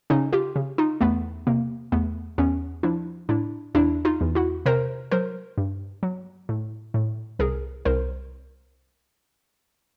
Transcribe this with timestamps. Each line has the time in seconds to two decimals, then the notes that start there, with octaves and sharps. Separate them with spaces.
0.10 C#3 C#4 D#4
0.33 F4 G4
0.56 C#3
0.78 D#4 F4
1.01 E2 A3 B3
1.47 C3 A#3
1.92 E2 A3 B3
2.38 E2 B3 C#4
2.83 F3 D4 E4
3.29 A2 D4 E4
3.75 E2 D4 E4
4.05 D#4 F4
4.21 E2
4.35 E4 F#4
4.66 C3 A#4 C5
5.11 F#3 A#4 C5
5.58 G2
6.03 F#3
6.49 A2
6.94 A2
7.39 C2 G#4 A#4
7.85 C2 A#4 C5